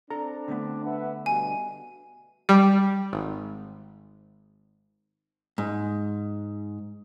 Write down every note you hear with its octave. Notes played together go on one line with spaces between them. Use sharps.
C4 D4 A4 A#5
D3 A3 B3
B4 E5 F#5
G2 B2 G#5
G3
G#1
G#2